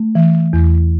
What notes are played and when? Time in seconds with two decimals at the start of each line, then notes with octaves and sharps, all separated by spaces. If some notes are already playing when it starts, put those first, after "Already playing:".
Already playing: A3
0.15 E3
0.53 E2